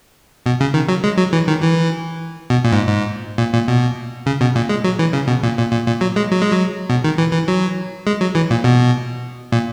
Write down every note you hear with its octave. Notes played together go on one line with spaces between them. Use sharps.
B2
C#3
D#3
F#3
G#3
F#3
E3
D#3
E3
B2
A#2
G#2
G#2
A#2
A#2
B2
C#3
B2
A#2
G#3
F#3
E3
C#3
B2
A#2
A#2
A#2
A#2
F#3
G#3
F#3
G#3
F#3
B2
D#3
E3
E3
F#3
G#3
F#3
E3
A#2
B2
A#2